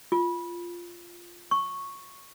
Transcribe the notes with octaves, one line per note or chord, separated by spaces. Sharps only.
F4
C#6